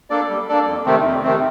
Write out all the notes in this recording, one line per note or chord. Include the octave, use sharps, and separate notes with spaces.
A#3 D4 A4 D5
G3
A#3 D4 A4 D5
F2
C3 D#3 A3 C4
F2
C3 D#3 A3 C4